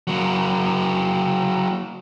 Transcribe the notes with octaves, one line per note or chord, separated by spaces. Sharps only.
F#3 A#3